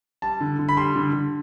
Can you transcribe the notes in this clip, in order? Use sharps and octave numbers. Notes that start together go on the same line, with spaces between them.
G3 A5
D3
D3
B5
G3 C6
D3
D3